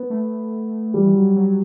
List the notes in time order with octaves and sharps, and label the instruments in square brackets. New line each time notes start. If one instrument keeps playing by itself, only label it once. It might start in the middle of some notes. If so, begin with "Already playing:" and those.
Already playing: [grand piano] B3
[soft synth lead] A3
[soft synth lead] E3 [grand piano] G3
[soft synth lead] E3
F#3
F#3